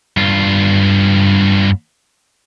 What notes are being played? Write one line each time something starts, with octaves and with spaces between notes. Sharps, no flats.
G2 F4